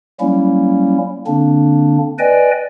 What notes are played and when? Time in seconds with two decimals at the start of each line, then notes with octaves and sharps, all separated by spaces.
0.20 F#3 G3 A#3 C#4 E4
1.27 D3 A#3 C4 D4
2.19 B4 D5 D#5 G5 G#5